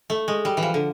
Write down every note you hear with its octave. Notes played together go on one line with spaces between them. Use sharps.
A3
G#3
G3
E3
F3
D3